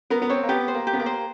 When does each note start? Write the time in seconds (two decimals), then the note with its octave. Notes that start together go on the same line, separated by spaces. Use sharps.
0.10 B3 A#4
0.22 B3
0.30 C4 C#5
0.43 A#3
0.49 B3 G4
0.68 C5
0.74 A#3
0.87 G4
0.93 B3
1.00 A#3
1.06 C5